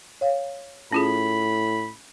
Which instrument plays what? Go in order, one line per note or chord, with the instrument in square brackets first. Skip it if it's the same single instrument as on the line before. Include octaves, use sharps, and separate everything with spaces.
[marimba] C#5 F5
[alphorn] A2 [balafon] C#4 F4 G#4 [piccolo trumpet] B5